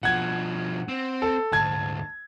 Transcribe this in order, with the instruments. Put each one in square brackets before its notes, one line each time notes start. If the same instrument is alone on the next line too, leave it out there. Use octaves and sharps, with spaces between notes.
[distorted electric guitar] B2 F3 [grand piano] F#5 G#6
[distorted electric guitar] C4
[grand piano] A4
[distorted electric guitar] D2 G#2 [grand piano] A5 G#6